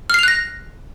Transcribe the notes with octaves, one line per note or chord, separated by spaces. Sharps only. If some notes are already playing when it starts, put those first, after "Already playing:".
F6 F#6 A#6 C7 F7